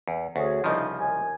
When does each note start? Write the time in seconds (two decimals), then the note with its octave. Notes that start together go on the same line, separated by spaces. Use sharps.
0.08 E2
0.36 D2 C#4 F#4 G#4
0.64 C2 C#3 F3 D#4
0.98 D#2 G#5